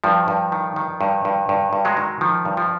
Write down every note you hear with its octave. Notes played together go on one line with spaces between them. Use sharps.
G2 F3
G2
D#3
D#3
G2
G2
G2
G2
F#3 G#3
D#3
D#3 F3
G2
F3